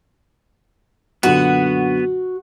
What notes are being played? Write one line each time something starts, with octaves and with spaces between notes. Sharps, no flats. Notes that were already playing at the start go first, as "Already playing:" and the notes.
F#2 A#2 D3 B3 F#4